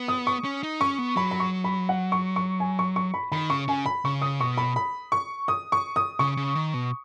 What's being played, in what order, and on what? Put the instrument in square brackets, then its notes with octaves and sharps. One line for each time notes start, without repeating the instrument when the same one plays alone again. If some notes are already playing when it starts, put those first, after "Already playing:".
Already playing: [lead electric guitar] B3
[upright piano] D#6
C#6
[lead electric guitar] C#4
D#4
[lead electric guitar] C#4 [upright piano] C#6
[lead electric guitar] B3
[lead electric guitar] F#3 [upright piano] B5
[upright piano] B5
C#6
B5
F#5
C#6
C#6
G#5
C#6
C#6
B5
[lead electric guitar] D#3 [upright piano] B5
[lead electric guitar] C#3 [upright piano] C#6
[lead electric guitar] C#3 [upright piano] G#5
[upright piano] B5
[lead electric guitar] C#3 [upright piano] C#6
[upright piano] D#6
[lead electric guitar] B2 [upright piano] C#6
[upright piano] B5
B5
C#6
D#6
C#6
D#6
[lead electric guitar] C#3 [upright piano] C#6
[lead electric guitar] C#3
D#3
B2